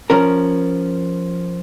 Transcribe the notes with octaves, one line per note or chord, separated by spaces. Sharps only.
F3 C#4 A#4